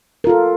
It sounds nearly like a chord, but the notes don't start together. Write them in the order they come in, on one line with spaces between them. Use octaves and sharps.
A#4 F4 A4